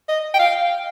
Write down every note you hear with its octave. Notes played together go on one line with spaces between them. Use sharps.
D#5
G5
F5